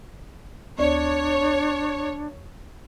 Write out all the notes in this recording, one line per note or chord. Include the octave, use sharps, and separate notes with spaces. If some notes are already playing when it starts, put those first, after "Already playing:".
D2 D4 C#5 D5